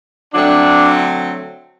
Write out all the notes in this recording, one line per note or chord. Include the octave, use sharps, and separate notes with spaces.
D3 F#3 A3 C4 D4